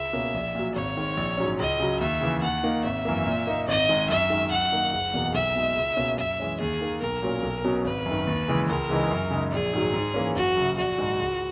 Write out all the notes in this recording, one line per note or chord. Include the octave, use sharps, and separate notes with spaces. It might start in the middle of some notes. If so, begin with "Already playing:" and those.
Already playing: C#2 E5
B2 A#3 C#4
A#1
A#2 F#3
G#1 C#5
G#2 D#3
A#1
G#2 F#3 C#4
C#2 D#5
C#3 F#3
D#2 E5
C#3 E3
D#2 F#5
D#3 A#3 D#4
G#1 E5
F#2 E3 A#3
A#2
A#3 D#4
G#1 D#5
G#2 D#3 G#3 D#4
F#2 E5
D#3 G#3
F#2 F#5
D#3 A#3 D#4
F#1
E2 B2 A#3 D#4
B1 E5
B2 G#3 D#4
C#2
B2 A#3 C#4
F#2 E5
E3 G#3 C#4
D#2 G#4
D#3 A#3
B1 A#4
A#2 F#3 A#3 C#4
B1
B2 F#3 C#4
G#1 B4
F#2
D#3
D#2
C#3 E3 G#3
C#2 A#4
C#3 E3 G#3 D#4
F#2
C#3 G#3 D#4
A#1 G#4
G#2 D#3 F#3
G#2
E3 A#3 C#4
F#1 F#4
F#2 C#3
A#1 F#4
G#2 D#3 G#3 D#4
C#2